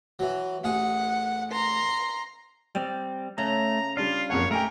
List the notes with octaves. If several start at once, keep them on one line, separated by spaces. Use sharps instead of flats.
E3 F#3
A1 G#4 F#5
A#5 C6
G3 C4 D5
C#3 A3 A#5
G3 D4 F4 F5
F#1 F2 C#5 F#5
A3 G4 A#4 G5 G#5 A#5